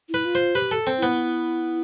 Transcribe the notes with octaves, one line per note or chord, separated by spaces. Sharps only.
E4
B4
F4
C5
G4 B4
A4
C4
B3 E4